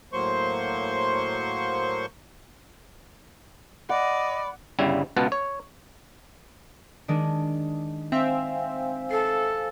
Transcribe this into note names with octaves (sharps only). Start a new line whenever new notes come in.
A2 F#3 A#3 C5 C6 C#6
D5 D#5 F#5 B5
G1 C#3 G3 E4
C#2 B2 B3 F4 F#5 A5
C#5
D#3 G#3 D4
C4 C5 E5 F5 G#5
A4 C7